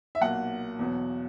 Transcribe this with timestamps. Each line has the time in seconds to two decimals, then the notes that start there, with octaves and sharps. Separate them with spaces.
0.15 E5
0.21 B1 A#2 A#3 F#5
0.79 E2 B2 F#3